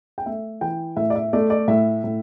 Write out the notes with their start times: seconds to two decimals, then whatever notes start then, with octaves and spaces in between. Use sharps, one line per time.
0.18 G5
0.26 A3 E5
0.61 E3 G5
0.96 A2 E5
1.10 D5
1.15 E5
1.33 A3 D5
1.50 D5
1.68 A2 E5
2.04 A2